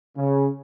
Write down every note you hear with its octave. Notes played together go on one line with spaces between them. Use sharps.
C#3